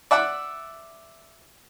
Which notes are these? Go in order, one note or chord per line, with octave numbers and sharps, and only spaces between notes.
D5 E5 F#5 E6